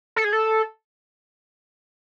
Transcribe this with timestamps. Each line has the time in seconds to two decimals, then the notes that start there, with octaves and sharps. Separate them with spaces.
0.16 A4
0.24 G#4
0.33 A4